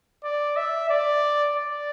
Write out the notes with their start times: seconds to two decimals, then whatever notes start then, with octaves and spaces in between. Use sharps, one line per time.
0.24 D5
0.57 E5
0.90 D5
1.56 D5